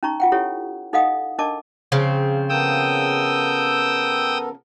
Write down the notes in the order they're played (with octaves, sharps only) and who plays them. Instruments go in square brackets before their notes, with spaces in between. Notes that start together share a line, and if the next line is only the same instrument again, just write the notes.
[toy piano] C#4 D#4 A#5 C#6
F4 F#5 G5
E4 G4 A4 C#5
D#4 A4 D#5 F5 F#5 D#6
D4 A#4 D#5 A5 D6
[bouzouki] C#3 F3 C4
[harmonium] B3 A4 A#4 [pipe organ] G5 D#6 E6